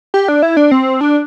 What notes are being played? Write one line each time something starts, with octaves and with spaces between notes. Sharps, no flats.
G4
D4
E4
D4
C4
D4